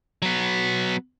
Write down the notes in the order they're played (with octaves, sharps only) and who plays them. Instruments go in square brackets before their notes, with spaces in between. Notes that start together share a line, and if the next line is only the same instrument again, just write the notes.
[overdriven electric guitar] F#3 B3